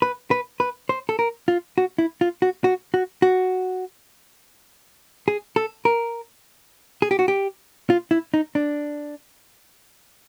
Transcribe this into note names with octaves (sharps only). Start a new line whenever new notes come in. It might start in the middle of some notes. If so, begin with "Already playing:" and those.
B4
B4
B4
C5
A4
A#4
F4
F#4
E4
F4
F#4
F#4
F#4
F#4
G#4
A4
A#4
G#4
G4
F#4
G4
F4
E4
D#4
D4